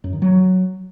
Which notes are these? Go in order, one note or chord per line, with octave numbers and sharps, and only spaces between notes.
F#2
D#3
F#3